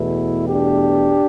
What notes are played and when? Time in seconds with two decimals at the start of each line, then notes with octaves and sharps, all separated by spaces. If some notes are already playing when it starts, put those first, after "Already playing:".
Already playing: E2 B2 A3 E4
0.47 D4 G4